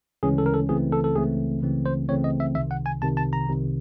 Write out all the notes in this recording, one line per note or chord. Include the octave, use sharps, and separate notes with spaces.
D2 C#3 E3 G#3 C#4 G#4
A4
A#4
A4
C#2 C#3 E3 A3 C4 G#4
A4
A4
C#2 C#3 E3 A3 C4 G#4
C#2 C#3 E3 A3 C4
C5
C#2 C#3 E3 A3 C4 C#5
D#5
E5
C2 C3 D#3 E5
F#5
G#5
C2 C3 D#3 A5
A5
A#5
C2 C3 D#3